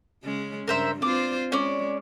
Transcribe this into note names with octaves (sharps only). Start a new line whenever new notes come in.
C#3 G#3 C#4
G2 C#3 A#4 C5 E5
C4 F4 C5 D5
G#3 C#4 D5